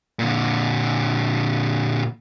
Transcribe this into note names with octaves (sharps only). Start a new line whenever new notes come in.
A#2 D3